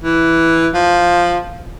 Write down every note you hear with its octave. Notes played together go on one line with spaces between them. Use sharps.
E3
F3